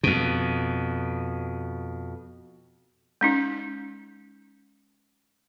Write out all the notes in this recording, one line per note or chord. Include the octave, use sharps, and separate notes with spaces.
F2 B2
G#3 C#4 D#4